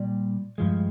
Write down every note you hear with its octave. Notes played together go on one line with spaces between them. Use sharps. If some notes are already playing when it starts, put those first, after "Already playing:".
Already playing: A#2 G3 D5
G2 F3 G#3